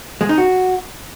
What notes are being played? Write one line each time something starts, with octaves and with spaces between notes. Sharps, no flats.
G#3
D#4
F#4